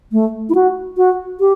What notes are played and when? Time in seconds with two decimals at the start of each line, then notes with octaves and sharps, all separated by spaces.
0.12 A3
0.49 E4
0.55 F#4
0.97 F#4
1.40 G4